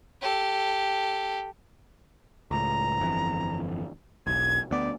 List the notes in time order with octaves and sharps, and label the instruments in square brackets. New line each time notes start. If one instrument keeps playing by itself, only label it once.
[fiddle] G4 A4
[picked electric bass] C#2 A2 [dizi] A#5
[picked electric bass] G1 F2 E3
[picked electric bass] E1 B1 [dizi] G#6
[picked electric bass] D2 B3 [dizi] D5